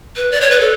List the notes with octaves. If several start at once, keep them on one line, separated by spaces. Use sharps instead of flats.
B4
D5
C#5
B4
A4